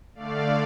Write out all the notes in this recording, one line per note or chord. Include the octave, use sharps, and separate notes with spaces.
D3 A3 D5 F5